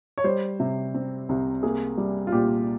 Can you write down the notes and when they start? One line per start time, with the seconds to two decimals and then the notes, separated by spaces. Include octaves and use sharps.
0.18 C#5
0.24 G3 C5
0.60 C3
0.94 C4
1.29 C2
1.63 A#3 G#4
1.97 G3
2.27 F4
2.32 A#2 G4